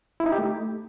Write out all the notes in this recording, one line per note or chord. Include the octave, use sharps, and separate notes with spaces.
E4
D#4
G4
A3